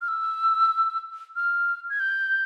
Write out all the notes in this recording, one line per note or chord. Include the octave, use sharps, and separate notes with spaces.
F6
E6
F6
G#6
G6